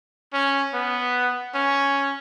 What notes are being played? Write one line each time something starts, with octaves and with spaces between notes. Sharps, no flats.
C#4
B3
C#4